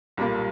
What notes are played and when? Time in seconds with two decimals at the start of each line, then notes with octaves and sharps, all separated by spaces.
0.17 B1 A#2 G3 A#3